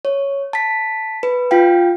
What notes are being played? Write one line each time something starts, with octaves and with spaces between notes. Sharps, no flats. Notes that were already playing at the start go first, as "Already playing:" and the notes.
C#5
A5 B6
B4
F4 F5 G5